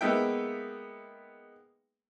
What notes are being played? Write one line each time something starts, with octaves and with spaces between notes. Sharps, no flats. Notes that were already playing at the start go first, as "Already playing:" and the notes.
G#3 A#3 B3 D#4 E5 G5